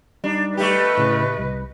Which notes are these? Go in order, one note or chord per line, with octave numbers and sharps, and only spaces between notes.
G3 D4 D#4
A3 G4 B4 D#5
A2 C#3
C2